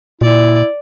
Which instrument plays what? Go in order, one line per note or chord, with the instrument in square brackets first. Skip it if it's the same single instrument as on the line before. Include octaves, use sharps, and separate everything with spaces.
[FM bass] A#2 [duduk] E4 [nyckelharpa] D5